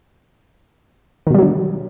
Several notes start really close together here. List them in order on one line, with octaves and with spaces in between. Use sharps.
D#3 B2 G3 F#3 D3